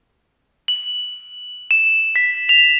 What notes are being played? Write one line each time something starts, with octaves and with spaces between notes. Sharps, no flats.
F#7
E7
B6
F7